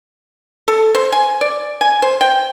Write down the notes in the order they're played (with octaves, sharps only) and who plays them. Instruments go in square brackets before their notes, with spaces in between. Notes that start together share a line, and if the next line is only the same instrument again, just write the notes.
[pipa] A4
C5
G#5
D5
G#5
C5
G5